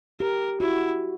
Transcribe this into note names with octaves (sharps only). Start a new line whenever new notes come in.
G4 A#4
E4 F#4